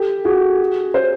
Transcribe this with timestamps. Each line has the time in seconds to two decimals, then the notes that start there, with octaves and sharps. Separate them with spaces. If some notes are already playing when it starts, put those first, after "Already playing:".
Already playing: G4 A4
0.25 F#4 G#4
0.94 C5